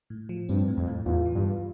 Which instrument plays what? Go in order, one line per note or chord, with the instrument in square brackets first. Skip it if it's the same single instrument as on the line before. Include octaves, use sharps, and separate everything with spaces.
[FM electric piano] A2
F3
[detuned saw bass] G2 [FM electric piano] C4
[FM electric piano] A2
[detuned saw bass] F2
[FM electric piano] A2
[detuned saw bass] E2 [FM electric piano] F4
[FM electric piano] E3
[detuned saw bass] G2
[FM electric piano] F4